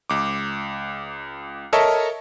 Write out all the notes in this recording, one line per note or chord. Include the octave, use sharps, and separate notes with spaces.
C#2 D6
A4 A#4 C#5 D#5 E5 A5